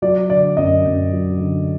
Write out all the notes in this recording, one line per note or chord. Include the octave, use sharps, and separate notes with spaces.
F#3 D5
D3 D5
F#2 D#5
F#2
F#3
D3